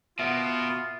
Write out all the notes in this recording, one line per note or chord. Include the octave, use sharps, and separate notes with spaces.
B2 B3 F4 E5